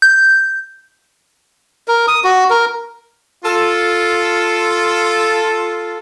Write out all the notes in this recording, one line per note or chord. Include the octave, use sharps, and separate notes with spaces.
G6
A#4
D#6
F#4
A#4
F4 A4